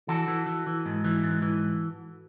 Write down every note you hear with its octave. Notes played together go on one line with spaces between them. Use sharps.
E3 F#4 A4
E3
E3
E3
G#2
E3
G#2
E3